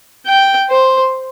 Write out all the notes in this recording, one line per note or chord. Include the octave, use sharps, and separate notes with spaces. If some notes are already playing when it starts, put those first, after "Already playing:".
G5
C5